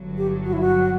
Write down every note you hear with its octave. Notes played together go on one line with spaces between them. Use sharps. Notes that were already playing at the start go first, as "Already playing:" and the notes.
Already playing: G1 G2 F#3
G4
F#4
E4
F#4